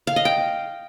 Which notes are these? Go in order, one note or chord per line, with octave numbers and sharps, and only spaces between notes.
F5
D#5
G5